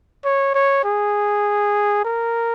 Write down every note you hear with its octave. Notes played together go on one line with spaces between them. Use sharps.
C#5
C#5
G#4
A#4